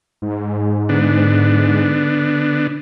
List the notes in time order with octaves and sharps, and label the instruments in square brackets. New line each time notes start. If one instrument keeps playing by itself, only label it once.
[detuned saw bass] G#2
[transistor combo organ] D3 B3 D4